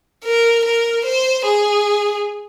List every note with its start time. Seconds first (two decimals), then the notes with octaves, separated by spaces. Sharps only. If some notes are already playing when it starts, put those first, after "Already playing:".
0.24 A#4
0.64 A#4
1.05 C5
1.45 G#4